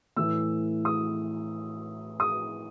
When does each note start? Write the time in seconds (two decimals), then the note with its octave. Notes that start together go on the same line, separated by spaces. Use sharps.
0.16 A2 E3 A3 E6
0.85 D#6
2.20 D#6